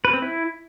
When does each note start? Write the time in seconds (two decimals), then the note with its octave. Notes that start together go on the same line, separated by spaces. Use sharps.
0.05 B4
0.13 C4
0.22 E4